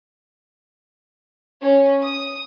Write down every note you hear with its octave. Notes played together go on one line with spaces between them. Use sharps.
C#4
D#6